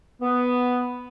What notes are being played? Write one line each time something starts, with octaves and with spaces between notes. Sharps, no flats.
B3